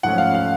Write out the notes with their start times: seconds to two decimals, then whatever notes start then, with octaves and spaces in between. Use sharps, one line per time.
0.03 G#2 F3 A3 C#4 F#5
0.18 F5
0.35 F5